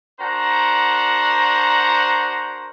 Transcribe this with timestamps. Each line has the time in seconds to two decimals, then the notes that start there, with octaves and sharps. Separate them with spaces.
0.20 D4 F#4 A#4 C5 F#5 A#5